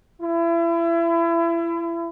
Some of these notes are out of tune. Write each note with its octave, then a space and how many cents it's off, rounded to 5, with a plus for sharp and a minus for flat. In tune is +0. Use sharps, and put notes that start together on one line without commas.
E4 +30